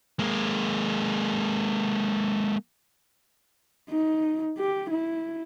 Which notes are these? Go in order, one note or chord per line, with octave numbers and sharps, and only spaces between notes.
G#3 A#3
D#4
G4
E4